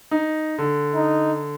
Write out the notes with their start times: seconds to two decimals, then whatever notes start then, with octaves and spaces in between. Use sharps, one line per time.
0.11 D#4
0.58 D3
0.95 D#4